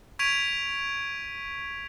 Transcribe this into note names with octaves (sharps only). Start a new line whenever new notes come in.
C#6 G#6 B6 D7 D#7 F7